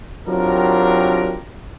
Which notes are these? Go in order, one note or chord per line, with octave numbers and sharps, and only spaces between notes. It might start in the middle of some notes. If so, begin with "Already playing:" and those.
F#3 C4 D4 F4 G4 A#4